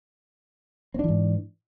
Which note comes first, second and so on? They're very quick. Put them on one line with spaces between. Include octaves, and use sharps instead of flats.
C4 D4 E3 G#2